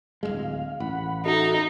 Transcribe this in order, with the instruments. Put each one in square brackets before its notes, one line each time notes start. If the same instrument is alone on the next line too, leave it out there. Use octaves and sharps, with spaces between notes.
[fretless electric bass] D1 B1 G#3 [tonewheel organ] F5
[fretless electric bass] A1 [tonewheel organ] F#5 B5
[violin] D#4 [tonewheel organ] F#4 A4 E5